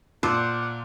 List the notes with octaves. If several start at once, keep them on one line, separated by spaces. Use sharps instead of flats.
A#2 C5 D5 F#5 A5 D6 E6